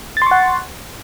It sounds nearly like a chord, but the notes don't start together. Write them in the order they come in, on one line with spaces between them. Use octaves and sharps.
A6 C6 C#6 F#5